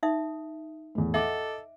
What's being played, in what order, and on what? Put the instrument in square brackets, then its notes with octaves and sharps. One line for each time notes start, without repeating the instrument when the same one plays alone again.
[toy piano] D#4 E5 D#6
[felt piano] E2 A2
[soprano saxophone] A4 [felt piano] D#5 F#5 D6 [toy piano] E5